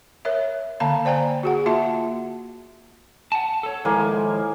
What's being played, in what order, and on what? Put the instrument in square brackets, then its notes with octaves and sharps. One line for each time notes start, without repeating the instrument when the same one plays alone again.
[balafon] A#4 C#5 E5
D3 A#3 F5 A5 A#5
C5 D5 G5 G#5 A#5
F#4 G#4 F#5
A#3 F4 F#4 E5 A5
[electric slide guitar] F#5 A5
A4 C#5
[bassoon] A2 [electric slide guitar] D#3 F3 G#3 [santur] A#3 G#5